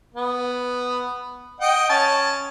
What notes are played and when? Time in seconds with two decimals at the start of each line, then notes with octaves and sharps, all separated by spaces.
0.14 B3
1.60 D#5 F#5 G5
1.90 C#4 A5